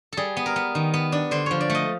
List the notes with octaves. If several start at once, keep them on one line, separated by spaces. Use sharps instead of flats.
G3 G#4 A4
B3
A#4
B3
D#3
B3
D4
D3 C5
F3 C#5
D5
A3
D#5